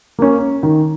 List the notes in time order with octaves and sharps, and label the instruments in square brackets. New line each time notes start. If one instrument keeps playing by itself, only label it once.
[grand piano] A#3 C#4
D#3